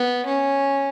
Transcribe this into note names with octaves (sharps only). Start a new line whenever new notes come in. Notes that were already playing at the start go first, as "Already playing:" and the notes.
Already playing: B3
C#4